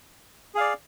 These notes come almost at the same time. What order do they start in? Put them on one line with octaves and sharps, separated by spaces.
G#4 F5 D5